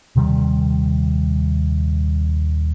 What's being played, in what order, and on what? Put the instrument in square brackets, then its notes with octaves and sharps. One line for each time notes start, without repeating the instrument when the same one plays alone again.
[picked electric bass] D#1 C3 D#3 G3